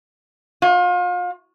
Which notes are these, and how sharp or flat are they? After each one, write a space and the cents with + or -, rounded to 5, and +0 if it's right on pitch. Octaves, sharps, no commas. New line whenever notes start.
F4 +35